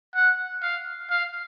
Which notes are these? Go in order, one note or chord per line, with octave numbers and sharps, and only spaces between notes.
F#5
F5
F5